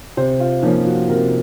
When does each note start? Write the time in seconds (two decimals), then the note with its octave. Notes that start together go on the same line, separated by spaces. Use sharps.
0.17 C3 C5
0.40 F4
0.62 F3 A#3 C#4 D#4
0.86 F#4
1.09 C3 A#4